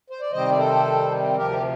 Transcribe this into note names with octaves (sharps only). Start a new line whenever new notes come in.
C5
D5
C3 D#3 G3 C4 C5 D#5
D5
A4 C5
D2 C3 F3 G4 A#4
G4